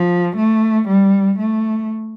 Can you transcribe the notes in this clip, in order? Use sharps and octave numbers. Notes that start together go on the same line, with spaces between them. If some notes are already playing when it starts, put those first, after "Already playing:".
Already playing: F3
A3
G3
A3